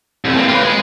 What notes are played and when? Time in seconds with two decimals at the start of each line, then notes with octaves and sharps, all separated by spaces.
0.25 C2 F2
0.37 A#3 C4
0.48 F4 B4
0.62 G#3